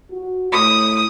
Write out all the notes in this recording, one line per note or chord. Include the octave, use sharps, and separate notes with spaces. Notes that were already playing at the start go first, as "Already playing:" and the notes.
F#4
A2 D#6